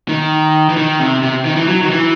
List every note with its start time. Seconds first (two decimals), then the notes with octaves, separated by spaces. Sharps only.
0.09 D#3
0.69 E3
0.77 D#3
1.00 C3
1.23 C3
1.45 D#3
1.56 E3
1.67 F#3
1.83 D#3
1.91 E3